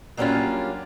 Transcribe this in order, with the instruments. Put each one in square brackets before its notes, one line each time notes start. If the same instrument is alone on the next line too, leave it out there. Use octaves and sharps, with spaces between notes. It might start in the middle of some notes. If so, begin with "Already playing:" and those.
[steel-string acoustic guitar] F#3 G3 A#3 C#4 D4 F4